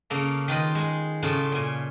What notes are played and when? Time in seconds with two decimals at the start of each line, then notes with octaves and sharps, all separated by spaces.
0.10 C#3 A#3 A4
0.48 D#3 F4 B4 D#5
0.75 G#3
1.23 A2 C#3 F4 A5
1.52 A#2 G#5